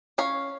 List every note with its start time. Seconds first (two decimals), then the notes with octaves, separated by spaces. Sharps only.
0.18 C#4 C#5 F5